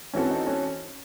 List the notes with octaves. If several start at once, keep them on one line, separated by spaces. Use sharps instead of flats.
E3 C4 C#4 F#4 A4
D#4
C#4